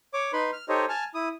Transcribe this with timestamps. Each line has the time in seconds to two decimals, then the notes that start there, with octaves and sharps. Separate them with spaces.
0.14 C#5 D6
0.33 D#4 B4 B5 C6
0.52 F6
0.69 D#4 G4 A4 C5 C#5 D#5
0.89 G#5 A5 F6
1.14 E4 D#6